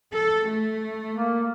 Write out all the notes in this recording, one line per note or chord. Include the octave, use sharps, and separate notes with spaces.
A4
A3
A#3